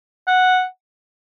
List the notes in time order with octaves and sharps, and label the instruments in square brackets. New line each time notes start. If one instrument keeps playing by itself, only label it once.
[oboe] F#5